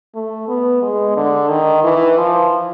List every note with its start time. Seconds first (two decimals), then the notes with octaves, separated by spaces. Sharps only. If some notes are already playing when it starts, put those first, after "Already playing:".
0.15 A3
0.48 B3
0.82 G#3
1.16 D3
1.49 D#3
1.84 E3
2.18 F3